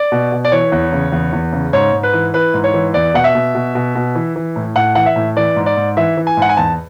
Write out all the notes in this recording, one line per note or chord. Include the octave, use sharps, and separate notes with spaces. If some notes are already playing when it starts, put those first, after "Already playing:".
Already playing: D5
B2
B2
D5
E3 C#5
E2
C#3
E2
E2
C#3
G#2 C#5
G#2
B4
E3
E3 B4
G#2
C#5
E3
E2 D5
B2 F#5
E5
B2
B2
B2
B2
E3
E3
A2
A2 F#5
E3 F#5
E5
A2
E3 D5
G#2
D5
G#2
E3 E5
E3
G#5
G#2 F#5
G#5
E2 A5